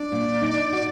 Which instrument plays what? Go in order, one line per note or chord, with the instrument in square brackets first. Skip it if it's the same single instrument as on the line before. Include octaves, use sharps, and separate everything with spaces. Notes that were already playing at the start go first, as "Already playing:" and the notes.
Already playing: [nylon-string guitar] D4 [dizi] D5
[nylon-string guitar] A#2
D#4
F#4